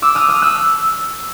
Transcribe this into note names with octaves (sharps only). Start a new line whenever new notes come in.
D6 E6
D#6 F6
D#6 F6
E6 F#6